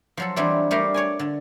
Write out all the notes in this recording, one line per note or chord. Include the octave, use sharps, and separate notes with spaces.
F3 F#3 A4
E3 F#3 G3 C4 D4
G3 A3 D4 G4 A#4 F5
C#5 D5 G#5
D3